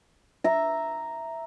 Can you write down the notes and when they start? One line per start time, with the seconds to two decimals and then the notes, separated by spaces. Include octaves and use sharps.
0.44 E5 A#5